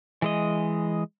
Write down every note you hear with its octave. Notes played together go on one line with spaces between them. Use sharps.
E3 G#3 D#5